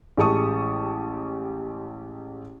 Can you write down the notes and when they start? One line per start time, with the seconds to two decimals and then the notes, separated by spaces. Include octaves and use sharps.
0.17 A1 G#3 G4 A5 C#6 D#6